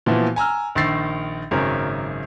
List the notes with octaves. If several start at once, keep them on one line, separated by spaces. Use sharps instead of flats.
A#2 E3 F3 B3 E4 F#4
G#5 A#5 E6 F6
A#1 D#3 E6 A6 C7
G#1 F#2 C#3 F#3 C#4 A#4